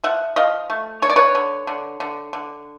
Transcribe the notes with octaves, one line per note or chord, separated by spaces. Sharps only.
F3 E5 F#5
F3 D#5 F5
A3
D4 C#5
D5
B4 C#5
D3
D3
D3
D3